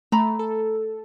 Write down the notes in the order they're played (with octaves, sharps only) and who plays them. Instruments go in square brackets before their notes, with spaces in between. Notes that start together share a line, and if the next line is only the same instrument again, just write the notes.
[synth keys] A3 [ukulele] A#5 B5
[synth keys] A4